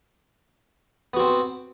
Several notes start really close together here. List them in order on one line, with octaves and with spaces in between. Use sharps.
B3 F#4 C4